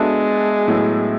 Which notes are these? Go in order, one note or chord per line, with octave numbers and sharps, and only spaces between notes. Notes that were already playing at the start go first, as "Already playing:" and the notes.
Already playing: G#3 B3 D4 F#4 A4 E5
A2 F#3 B3 E4